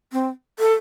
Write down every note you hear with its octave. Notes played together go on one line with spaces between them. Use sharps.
C4
A4